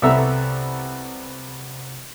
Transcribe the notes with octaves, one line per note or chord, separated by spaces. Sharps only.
C2 B3 A4 E5 A#5